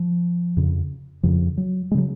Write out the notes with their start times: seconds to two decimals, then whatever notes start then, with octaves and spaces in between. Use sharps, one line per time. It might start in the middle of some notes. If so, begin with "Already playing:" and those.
Already playing: F3
0.57 F2 C#3
1.23 F2 C#3 F3
1.57 F#3
1.91 G#3
1.95 C#3 F#3